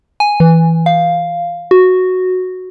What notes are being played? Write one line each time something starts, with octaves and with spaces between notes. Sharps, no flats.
G#5
E3
F5
F#4